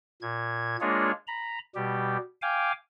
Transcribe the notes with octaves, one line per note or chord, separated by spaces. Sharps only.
A#2 G#6
G#3 A#3 D4 F4 G#4 C#5
A#5 B5
B2 G3 G4
F5 G5 G#5 D6